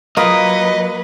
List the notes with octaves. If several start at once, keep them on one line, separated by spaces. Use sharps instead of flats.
F#3 A#3 F4 A#4 B4 D#5 D#6